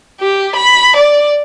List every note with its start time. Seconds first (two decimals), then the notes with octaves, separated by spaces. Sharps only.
0.21 G4
0.56 B5
0.97 D5